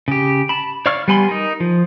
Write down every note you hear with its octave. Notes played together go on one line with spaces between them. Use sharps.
C#3 G4
A5 B5
C#5 D5 F5 C#6 F6
G3 B3 G#5 B5 C6
D#4 A#4
F3